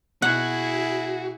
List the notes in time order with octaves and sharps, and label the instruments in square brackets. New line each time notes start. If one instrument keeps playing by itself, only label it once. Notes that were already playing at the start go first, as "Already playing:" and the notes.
[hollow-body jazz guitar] B2 [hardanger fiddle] E4 G#4 [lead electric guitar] F#4 [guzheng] F#5